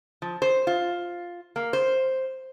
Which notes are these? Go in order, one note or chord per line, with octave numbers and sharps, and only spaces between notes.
F3
C5
F4
A#3
C5